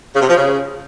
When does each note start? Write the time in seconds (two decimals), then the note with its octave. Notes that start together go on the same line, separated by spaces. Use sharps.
0.14 C#3
0.21 C3
0.29 F3
0.36 C#3